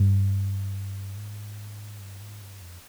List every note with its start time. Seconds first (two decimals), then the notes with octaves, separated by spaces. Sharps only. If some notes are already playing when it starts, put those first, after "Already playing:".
Already playing: G2
1.16 G#2
2.00 G2
2.21 G#2
2.41 G2
2.61 F2